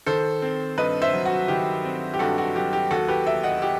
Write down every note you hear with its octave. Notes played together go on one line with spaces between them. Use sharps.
D#3 A4 C5
C4
G2 B4 D#5
C5 E5
F#3
F#4
D#3 G4
C4
G4
G2 F#4 A4
F#4
F#3 G4
G4
D#2 F#4 A4
G4 B4
E1 E5 G5
D#5 F#5
G4